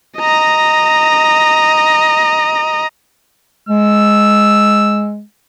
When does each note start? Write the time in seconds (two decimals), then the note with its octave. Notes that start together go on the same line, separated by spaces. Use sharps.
0.18 D#5 A#5
3.69 G#3 E6